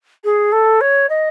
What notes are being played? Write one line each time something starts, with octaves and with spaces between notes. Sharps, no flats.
G#4
A4
C#5
D#5